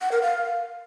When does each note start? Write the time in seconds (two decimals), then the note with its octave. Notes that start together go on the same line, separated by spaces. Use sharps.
0.01 F#5
0.12 A#4
0.22 F5